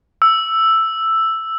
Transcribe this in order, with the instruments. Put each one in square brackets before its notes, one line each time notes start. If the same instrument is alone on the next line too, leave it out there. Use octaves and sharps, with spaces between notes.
[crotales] E6